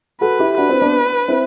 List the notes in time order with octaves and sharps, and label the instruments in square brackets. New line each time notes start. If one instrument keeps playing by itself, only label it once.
[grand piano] F#4 A4 [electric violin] B4
[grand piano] E4 G4
[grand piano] D4 F#4 [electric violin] B4
[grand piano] C4 E4
B3 D4
C4 E4